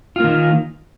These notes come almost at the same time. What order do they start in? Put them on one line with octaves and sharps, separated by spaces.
F4 A#3 D#3